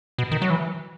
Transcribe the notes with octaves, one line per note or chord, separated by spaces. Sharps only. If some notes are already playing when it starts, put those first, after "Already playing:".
B2
D#3
F#3
E3